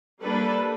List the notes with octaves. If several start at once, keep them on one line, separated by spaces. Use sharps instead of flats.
G3 A#3 D4 A4 B4